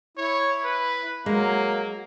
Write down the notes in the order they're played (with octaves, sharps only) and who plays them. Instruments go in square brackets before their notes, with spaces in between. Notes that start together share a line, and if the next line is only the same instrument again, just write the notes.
[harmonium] E4 [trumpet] C#5
[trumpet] B4
[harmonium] F#3 [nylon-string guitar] G#3 [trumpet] A#3